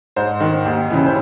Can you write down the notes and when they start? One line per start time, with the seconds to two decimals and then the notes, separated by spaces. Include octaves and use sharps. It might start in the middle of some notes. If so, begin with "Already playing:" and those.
0.16 G#2 C5
0.41 D#3
0.65 D#2
0.90 C#3 E3
1.06 C5